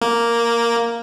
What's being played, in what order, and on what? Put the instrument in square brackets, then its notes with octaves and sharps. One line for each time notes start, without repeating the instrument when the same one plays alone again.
[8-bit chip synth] A#3